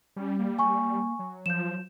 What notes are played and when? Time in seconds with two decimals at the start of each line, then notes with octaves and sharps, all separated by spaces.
0.16 G3 C#4
0.39 A#3
0.59 G#5 C#6
1.19 F#3
1.46 F3 G6 E7